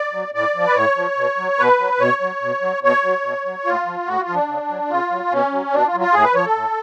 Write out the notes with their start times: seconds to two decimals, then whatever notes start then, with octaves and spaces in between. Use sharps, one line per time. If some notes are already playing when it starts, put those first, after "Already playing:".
Already playing: D5
0.13 F#3
0.34 A2 D5
0.55 F3
0.67 B4
0.76 A2 C#5
0.97 F3
1.17 B2
1.38 F#3
1.59 B2 B4
1.79 F#3
2.00 B2 C#5
2.21 F#3
2.42 B2
2.62 F#3
2.83 B2 C#5
3.04 F#3
3.24 B2
3.45 F#3
3.66 A2 F4
3.86 F3
4.07 A2 F#4
4.20 F4
4.28 F3
4.34 D4
4.48 C#3
4.69 F#3
4.90 C#3 F4
5.11 F#3
5.32 B2 C#4
5.52 F#3
5.73 B2 D4
5.87 F4
5.94 F#3
6.00 F4
6.14 A2 G#4
6.24 B4
6.35 F3 C#5
6.45 A4
6.55 A2